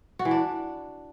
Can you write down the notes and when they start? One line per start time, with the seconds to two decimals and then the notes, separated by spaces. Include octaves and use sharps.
0.19 F#4
0.25 E3
0.31 D4